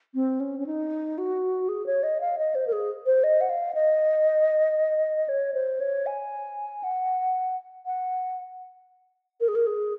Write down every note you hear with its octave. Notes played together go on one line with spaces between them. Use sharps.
C4
C#4
C#4
D#4
F#4
G#4
C#5
D#5
F5
D#5
C5
A#4
G#4
C5
D#5
F#5
F5
D#5
C#5
C5
C#5
G#5
F#5
F#5
A#4
G#4
A#4
G#4